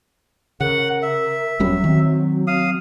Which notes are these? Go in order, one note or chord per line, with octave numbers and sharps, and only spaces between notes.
C#3 A#4 F#5
E5
E1 F#3 G3 C#4
D#3 C4
C4 F5 D#6